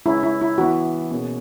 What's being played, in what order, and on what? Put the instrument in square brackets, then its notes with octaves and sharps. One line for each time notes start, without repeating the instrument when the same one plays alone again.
[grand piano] C#3 G#3 C#4 [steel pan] E4
[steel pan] E4
E4
[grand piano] E3 B3 E4 [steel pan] F#4
[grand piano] B2 A#3 C#4 G#4